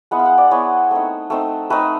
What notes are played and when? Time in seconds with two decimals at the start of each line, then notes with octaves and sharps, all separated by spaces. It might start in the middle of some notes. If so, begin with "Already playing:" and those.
0.11 G#3 B3 E4 F#5
0.19 F5
0.25 F#5
0.38 D5
0.51 G#3 B3 E4 C#5
0.91 A3 C4 D#4
1.30 A3 C4 D#4
1.70 A3 C4 D#4 B4